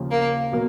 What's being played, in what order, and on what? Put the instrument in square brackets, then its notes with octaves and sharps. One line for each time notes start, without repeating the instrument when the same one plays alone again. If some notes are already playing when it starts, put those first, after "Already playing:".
Already playing: [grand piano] D#2 C#3 F3
[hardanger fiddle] A#3
[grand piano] B2 F#3 A#3